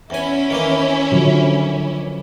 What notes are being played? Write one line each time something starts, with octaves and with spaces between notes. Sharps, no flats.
E2 C#4 E4 G#5
D#3 E3 A#3
D3 F3 F#3